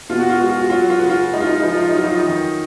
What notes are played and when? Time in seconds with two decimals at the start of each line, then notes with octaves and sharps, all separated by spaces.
0.09 B2 F4
0.20 F#4
0.30 F4
0.39 G#3 F#4
0.50 F4
0.59 F#4
0.70 F#3 F4
0.79 F#4
0.90 F4
0.99 C#3 F#4
1.09 F4
1.33 G#3 D#4
1.40 F4
1.47 D#4
1.54 F4
1.62 F3 D#4
1.69 F4
1.76 D#4
1.82 F4
1.89 D#4
1.95 F#3 F4
2.03 D#4
2.11 F4
2.18 D#4
2.27 D#3